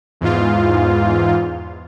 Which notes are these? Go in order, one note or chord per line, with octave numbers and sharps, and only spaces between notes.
E2 G#2 F4